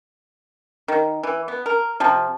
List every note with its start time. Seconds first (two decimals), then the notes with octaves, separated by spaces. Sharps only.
0.88 D#3
1.23 E3
1.48 B3
1.66 A#4
2.00 C3 F3